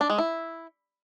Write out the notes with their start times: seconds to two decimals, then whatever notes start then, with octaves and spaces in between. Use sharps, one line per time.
0.01 D4
0.10 G#3
0.18 E4